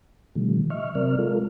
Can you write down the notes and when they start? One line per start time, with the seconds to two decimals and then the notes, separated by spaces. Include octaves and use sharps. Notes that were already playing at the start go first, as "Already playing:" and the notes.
0.35 B2 D3 D#3 F3 G3 A3
0.70 D#5 E5 C#6 F6
0.95 C3 F#3 C4 A#4 D5 F6
1.19 G#3 F4 A4 A#4